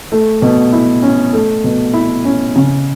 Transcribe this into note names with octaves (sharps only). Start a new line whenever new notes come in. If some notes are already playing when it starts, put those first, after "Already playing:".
A3
B2
E4
C#4
A3
B2
E4
C#4
C#3